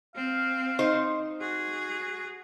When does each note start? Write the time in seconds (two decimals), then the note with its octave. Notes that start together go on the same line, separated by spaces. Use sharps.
0.15 C4 F5
0.79 D#4 C5
1.41 F#4 G#4